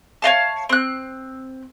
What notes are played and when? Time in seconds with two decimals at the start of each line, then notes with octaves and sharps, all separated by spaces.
0.22 C#5 D#5 F5 A5
0.69 C4 F#6